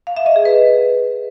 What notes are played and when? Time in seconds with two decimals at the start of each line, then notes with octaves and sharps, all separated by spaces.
0.07 F5
0.17 E5
0.26 D#5
0.36 G#4
0.45 B4